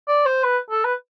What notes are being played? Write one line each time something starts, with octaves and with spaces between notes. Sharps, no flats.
D5
C5
B4
A4
B4